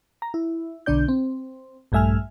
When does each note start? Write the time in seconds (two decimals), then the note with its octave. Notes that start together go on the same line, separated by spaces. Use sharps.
0.22 A#5
0.34 E4
0.86 B1 D3 D4 D5 G6
1.08 C4
1.92 A#1 G2 A3 E5 G#5 F6